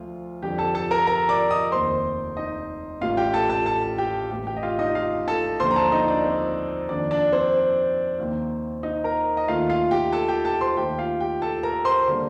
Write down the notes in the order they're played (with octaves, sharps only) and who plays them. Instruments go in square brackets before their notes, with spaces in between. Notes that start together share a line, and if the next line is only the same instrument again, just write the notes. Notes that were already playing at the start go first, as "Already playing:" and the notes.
Already playing: [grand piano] D2 F3 A3 F4
F2 D3 G3 G4 G5
A4 A5
A4 A5
A#4 A#5
A#4 A#5
D5 D6
D#5 D#6
F1 D#2 D#3 C5 C6
D#4 D#5
A1 A2 G3 F4 F5
G4 G5
A4 A5
A4 A5
A4 A5
G4 G5
A1 A2 A3 G4 G5
G4 G5
D#5
F4 F5
D#4 D#5
F4 F5
A4 A5
D#2 D3 F3 A#3 C5 C6
A#5
A4 A5
D#4 D#5
D4 D5
C4 C5
F2 D#3 A#3 D4 D5
D4 D5
C4 C5
D#2 D#3 A#3
D#4 D#5
A#4 A#5
D#5
D#2 D#3 A3 F4 F5
F4 F5
G4 G5
A4 A5
G4 G5
A4 A5
C5 C6
D#2 D#3 A3 G4 G5
F4 F5
G4 G5
A4 A5
A#4 A#5
C5 C6
D3 G3 A#3